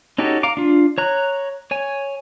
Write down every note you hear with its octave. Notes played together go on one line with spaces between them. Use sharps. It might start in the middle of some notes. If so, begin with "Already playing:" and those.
C#4 D#4 F#4 G4 A4
F5 A#5 D6
D4 F4
C#5 A#5 F#6
C#5 G#5